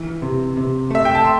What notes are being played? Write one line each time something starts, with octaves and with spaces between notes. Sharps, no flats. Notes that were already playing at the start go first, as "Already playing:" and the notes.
Already playing: E3
C3
C3
A3 E5
G5
A5
C6